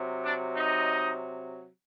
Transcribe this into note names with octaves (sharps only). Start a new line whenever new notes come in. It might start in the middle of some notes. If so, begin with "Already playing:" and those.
Already playing: C3 F#3
D4 D5
D#4 D#5